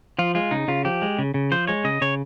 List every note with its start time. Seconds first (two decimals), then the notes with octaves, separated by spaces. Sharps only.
0.19 F3 F4
0.35 G#3 F4
0.51 C#3 D#4
0.68 C#3 F4
0.85 F3 G4
1.02 G#3
1.19 C#3
1.34 C#3
1.51 F3 C5
1.67 G#3 C#5
1.84 C#3 D#5
2.01 C#3 C#5